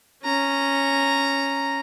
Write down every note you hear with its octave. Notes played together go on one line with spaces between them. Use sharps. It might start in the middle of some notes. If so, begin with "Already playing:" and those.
C#4 A#5